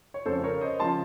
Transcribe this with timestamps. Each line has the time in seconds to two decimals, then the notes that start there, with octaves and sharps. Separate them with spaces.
0.14 C#5
0.26 F2 C#3 F3 A4 C5
0.44 A#4 C#5
0.61 C5 D#5
0.80 C#3 F3 A5 C6